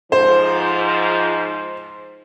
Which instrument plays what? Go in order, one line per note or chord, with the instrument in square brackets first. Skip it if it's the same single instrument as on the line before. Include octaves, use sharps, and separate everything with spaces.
[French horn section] G#2 F3 [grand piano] C5